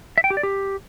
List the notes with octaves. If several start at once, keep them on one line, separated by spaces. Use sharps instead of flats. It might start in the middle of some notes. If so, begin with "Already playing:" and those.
E5
G5
G4
D5
G4